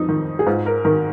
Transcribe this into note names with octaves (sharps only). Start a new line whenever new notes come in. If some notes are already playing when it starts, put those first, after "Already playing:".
Already playing: F2 D#4
D#3
G#4
G#2 F4
A#4
D#3 A#4